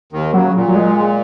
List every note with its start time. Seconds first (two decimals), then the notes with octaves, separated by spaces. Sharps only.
0.12 D#2 D#3
0.34 C#3 F#3
0.55 A#2
0.68 F#3
0.75 G#3